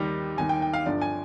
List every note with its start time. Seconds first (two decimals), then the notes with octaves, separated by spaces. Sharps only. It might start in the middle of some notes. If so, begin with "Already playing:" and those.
Already playing: D#2 D#3 G3
0.37 D#2 D#3 G3 G#5
0.49 G5
0.62 G5
0.73 F5
0.86 G1 G2 D3 F3 D5
1.01 G#5